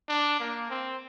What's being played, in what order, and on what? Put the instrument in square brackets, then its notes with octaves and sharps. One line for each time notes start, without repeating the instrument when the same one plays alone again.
[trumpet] D4
A#3
C4